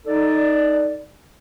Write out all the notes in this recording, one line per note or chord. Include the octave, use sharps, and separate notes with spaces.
D#4 A4 D5